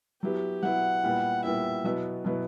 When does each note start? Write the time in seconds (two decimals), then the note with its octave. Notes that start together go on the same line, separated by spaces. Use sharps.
0.22 F#3 B3 E4 G4
0.62 F#3 B3 E4 F#5
1.04 A#2 G3 B3 E4
1.44 A#2 G3 B3 E4 E5
1.84 B2 F#3 B3 E4
2.25 B2 F#3 B3 E4